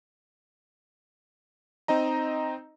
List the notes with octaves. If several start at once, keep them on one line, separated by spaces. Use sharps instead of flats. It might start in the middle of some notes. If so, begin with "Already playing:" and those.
C4 D#4 D#5 A#5